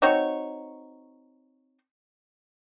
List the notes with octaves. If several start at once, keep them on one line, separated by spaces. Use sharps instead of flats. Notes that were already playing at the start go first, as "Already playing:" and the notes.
C4 D#4 F#4 C#5